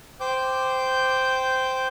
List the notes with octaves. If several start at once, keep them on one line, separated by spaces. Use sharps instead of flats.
C5 G5 D6 G6